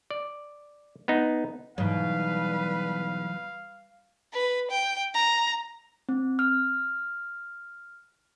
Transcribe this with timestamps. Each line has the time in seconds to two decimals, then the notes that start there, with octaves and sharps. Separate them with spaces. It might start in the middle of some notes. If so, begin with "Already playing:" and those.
0.11 D5
1.08 B3 D#4
1.78 G#2 B2 E3 F#3 G3 B4 F5
4.34 B4
4.71 G5
5.15 A#5
6.09 C4
6.39 F6